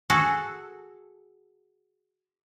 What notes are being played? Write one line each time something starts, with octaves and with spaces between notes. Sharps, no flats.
F#4 G#4 A4